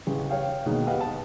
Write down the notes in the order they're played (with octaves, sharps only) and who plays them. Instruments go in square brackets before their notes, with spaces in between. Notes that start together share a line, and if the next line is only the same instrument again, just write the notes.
[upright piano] A1 C#3
C#5 F5 G5
B2 D#3 G#3 A#3
G4 B4 D#5 F5 F#5
A5